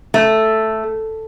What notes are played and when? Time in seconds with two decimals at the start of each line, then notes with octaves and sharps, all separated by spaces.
0.14 A3